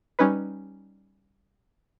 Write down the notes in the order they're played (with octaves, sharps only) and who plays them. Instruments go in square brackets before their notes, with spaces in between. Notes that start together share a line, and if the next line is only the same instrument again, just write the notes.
[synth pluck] G3 C#4 D#4 B4